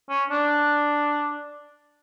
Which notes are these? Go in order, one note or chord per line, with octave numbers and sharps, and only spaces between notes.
C#4
D4